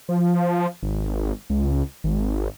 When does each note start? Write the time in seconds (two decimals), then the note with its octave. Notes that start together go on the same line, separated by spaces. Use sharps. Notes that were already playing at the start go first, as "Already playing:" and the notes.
0.09 F3
0.83 G#1
1.50 C#2
2.04 G#1